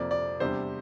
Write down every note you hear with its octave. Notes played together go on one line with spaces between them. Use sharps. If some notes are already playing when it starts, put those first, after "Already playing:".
Already playing: F2 C3 F3 A#3 D5
D5
E2 C3 G3 D4 C5